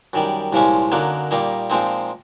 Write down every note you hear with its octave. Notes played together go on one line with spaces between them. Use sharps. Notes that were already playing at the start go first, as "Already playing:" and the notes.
F#2 D#3 G3
C2 A#2 F3 G#3 C#4
F#2 D3 F#3 A#3 D#4
A#2 G3 A#3 D#4
A#2 F3 G#3 C4 D#4